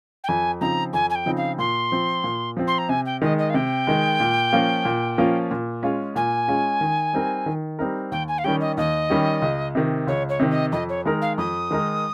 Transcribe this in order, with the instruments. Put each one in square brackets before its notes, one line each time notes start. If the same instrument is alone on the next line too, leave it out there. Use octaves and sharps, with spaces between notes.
[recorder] G5
[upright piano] F2 [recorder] G#5
[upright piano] C#3 F3 C4 D#4 [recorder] A#5
[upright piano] F2 [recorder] G#5
[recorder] G#5
G5
[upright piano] C#3 F3 C4 D#4
[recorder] F5
[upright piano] A#2 [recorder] C6
[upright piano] F3 C4
A#2
F3 C4
[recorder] C6
A#5
[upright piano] C3 [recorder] G#5
[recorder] G5
[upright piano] D#3 G#3 [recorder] D#5
[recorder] D#5
F5
[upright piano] C3 [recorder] G5
[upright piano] D#3 G#3
A#2
F3 A#3 C#4 F4
A#2
F3 A#3 C#4 F4
A#2
G#3 C#4 F4 G#4
[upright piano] A#2 [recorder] G#5
[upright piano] G#3 C#4 F4 G#4
D#3
G3 C4 D#4 A#4
D#3
G3 C4 D#4 A#4
[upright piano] D#2 [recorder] G5
[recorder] G#5
F5
[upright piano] D#3 G3 C#4 G4 [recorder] G5
[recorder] D#5
[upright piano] D#2 [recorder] D#5
[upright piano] D#3 G3 C#4 G4
C#2
C3 D#3
[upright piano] C#2 [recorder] C#5
[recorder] C#5
[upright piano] C3 D#3
[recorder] D#5
[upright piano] F2 [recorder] D#5
[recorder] C#5
[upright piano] D#3 G#3 D#4 A#4
[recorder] F5
[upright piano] F2 [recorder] D#6
[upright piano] D#3 G#3 D#4 A#4